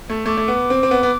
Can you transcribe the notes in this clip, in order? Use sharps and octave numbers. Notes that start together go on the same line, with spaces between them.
A3
A3 D6
A3
B3
C4
C4
B3
B3